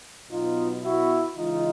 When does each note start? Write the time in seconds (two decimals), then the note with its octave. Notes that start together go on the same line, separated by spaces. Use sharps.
0.29 B2 F#3 B3 D#4 F4
0.83 E4 F#4
1.36 C#3 E3 G#3 D#4 F4